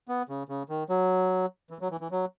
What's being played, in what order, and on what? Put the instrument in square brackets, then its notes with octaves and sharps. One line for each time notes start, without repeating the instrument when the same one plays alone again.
[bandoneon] B3
C#3
C#3
D#3
F#3
E3
F#3
E3
E3
F#3